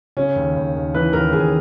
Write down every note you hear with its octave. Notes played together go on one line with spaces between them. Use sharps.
C#3 C#4
D#2
D#2
D#2
E3 B4
D#2 A#4
D#2 G#4